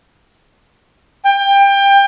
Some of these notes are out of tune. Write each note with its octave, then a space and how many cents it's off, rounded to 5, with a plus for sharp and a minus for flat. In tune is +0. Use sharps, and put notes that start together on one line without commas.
G5 +25